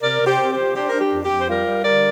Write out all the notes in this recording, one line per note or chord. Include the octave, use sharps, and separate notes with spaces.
C3 A#4 D5
C3
G4 C5
C4
G4 C5
F3
D4 G4 C5
D4 A#4
G4
F2
F2 G4
C5
G3 F4 A#4
G3
D3 A#4 D5